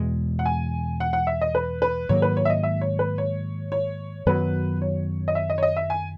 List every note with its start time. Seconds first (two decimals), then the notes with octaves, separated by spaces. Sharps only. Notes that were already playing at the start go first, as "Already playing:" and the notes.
Already playing: E2 B2 G#3
0.39 F#5
0.46 G#5
1.00 F#5
1.13 F#5
1.27 E5
1.41 D#5
1.55 B4
1.82 B4
2.09 G#2 D#3 F#3 A#3 C#5
2.22 B4
2.37 C#5
2.45 E5
2.50 D#5
2.63 E5
2.81 C#5
2.99 B4
3.18 C#5
3.72 C#5
4.26 F#2 D#3 F#3 B3 B4
4.82 C#5
5.28 D#5
5.35 E5
5.50 D#5
5.58 C#5
5.63 D#5
5.77 E5
5.90 G#5